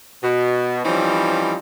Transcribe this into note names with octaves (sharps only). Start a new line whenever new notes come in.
B2
E3 F3 G3 C4 C#4 D#4